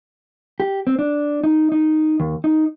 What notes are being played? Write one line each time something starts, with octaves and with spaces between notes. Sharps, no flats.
G4
C4
D4
D#4
D#4
D#2
D#4